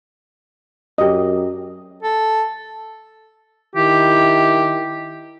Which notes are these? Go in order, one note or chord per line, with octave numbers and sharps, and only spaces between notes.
F#2 G4 D#5
A4
D#3 E4 G4